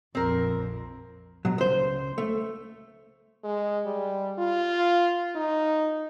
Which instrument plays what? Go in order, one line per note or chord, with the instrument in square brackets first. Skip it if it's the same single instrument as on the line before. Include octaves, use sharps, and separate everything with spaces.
[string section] A#1 F2 [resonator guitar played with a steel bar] C4 A#4
[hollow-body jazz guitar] B2 F#3
C#2 C5
A3
[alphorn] G#3
G3
F4
D#4